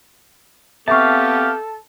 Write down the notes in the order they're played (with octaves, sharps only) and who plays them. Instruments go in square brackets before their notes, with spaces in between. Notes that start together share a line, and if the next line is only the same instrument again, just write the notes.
[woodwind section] B3 C4 G4 [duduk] A4 [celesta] E5 C#6 [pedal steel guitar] F5 A5